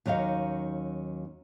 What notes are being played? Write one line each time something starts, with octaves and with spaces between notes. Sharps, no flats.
D#2 F#3 C#4 D#4 F5